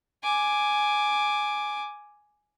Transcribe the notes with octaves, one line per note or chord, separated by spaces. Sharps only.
G#5 D6